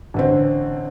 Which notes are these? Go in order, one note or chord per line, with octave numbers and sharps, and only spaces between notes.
A1 D3 C4